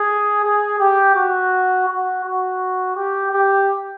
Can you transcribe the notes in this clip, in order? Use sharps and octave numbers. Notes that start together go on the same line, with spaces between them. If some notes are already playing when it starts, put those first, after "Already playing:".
Already playing: G#4
G#4
G4
F#4
F#4
F#4
G4
G4